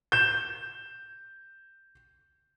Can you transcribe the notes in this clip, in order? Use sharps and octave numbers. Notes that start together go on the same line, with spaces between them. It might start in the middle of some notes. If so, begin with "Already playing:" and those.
G6 E7